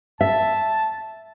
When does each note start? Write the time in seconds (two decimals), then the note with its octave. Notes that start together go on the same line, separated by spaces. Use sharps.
0.21 E5 A5